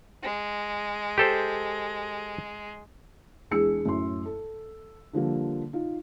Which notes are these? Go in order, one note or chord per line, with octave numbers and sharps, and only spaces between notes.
G#3
G4 A4 C5
E2 G#3 D4 G#4 E6 C#7
F#2 A2 C6
A4
D3 F3 G3 A#3
D#4 F4